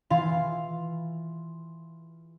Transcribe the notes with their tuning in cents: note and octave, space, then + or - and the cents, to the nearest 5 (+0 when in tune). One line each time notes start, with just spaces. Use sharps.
E3 +0 F4 +0 F5 +0